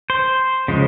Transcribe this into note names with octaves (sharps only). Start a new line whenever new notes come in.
C5
C#3 F3 G#3